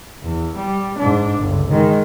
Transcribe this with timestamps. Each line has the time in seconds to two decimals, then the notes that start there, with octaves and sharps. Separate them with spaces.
0.23 E2
0.56 G3
0.98 G#2 D4
1.41 G1 C#2
1.71 D#3 G#3